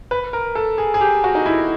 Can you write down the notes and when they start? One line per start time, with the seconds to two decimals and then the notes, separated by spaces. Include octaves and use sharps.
0.11 B4
0.33 A#4
0.55 A4
0.78 G#4
0.94 G#4
1.01 G4
1.24 F#4
1.35 D#4
1.46 E4